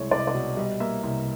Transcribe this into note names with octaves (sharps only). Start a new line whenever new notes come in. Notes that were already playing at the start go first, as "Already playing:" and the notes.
Already playing: C2 G#3 C#5
C2 D5
D#5
D5
B2
G3 D#5
A#3 E5
C2